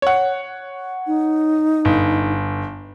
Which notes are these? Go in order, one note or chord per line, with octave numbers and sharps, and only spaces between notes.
C#5 F#5
D#4
G1